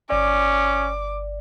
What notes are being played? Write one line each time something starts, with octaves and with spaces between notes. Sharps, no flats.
G1 C#4 D5 D6